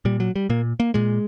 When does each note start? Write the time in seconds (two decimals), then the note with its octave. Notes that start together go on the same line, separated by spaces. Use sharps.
0.05 A#2 G3
0.20 F#3
0.36 G3
0.50 A#2 A#3
0.80 A#3
0.94 A#2 G#3